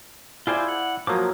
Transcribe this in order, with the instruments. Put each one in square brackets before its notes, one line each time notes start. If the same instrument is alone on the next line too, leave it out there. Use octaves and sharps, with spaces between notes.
[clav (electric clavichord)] E4 D5 G5 [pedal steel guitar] F4 G#4 C5
[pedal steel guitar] F#5
[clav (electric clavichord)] F3 F#3 A#3 [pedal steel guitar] D6 D#6